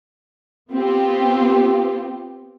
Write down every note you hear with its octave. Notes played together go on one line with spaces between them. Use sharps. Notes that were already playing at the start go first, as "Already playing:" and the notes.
B3 C4 F4 G4